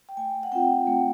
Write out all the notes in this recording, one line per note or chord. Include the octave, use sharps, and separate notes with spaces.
G5
A3 G#5
F#5
C4 F4 G5
A3